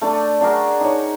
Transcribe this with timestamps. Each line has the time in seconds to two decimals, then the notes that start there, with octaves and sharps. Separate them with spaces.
0.01 A3 D4 D5
0.41 D4 F#4 G#4 A#4
0.81 D#4 C#5